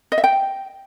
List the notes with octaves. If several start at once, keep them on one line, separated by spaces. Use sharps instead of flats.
D#5
E5
G5